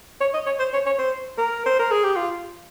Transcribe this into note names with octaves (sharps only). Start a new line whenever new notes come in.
C#5
D#5
C#5
C5
C#5
C#5
C5
A#4
C5
A#4
G#4
G4
F4